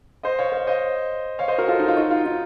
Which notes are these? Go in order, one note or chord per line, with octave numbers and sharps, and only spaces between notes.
C5 D#5
C#5 F5
C#5 F5
C5 D#5
C#5 F5
C5 D#5
F#4 A#4
F4 A4
D#4
F4
D#4 F#4
F4
D#4